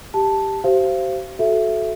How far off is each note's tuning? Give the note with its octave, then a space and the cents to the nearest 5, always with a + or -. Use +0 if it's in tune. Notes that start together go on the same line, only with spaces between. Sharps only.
G4 +0 A5 +0
G4 -45 C5 +0 F5 -35
F#4 +0 A4 -15 E5 +10